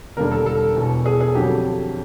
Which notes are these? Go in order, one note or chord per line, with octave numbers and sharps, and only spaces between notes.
E1 D#2 D3 G3 A#4
A4
A4
E1 E2 B2
G#4
G#4
F2 D3 F#3 G4